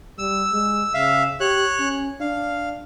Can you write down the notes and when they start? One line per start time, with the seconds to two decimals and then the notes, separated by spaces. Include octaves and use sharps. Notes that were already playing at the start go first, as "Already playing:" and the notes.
0.18 G3 E6
0.52 G#3
0.94 C#3 E5 F5
1.40 G4 C#5 F#6
1.80 C#4
2.21 D4 F5